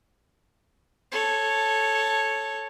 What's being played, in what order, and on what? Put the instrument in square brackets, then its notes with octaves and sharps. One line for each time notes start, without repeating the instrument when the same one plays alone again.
[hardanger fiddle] A4 C#5